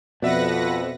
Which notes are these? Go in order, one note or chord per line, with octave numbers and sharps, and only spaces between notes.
F2 B2 B4 D5 E5 F#5 A#6